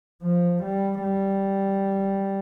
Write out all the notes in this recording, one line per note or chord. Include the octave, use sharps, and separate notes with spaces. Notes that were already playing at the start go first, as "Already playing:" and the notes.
F3
G3
G3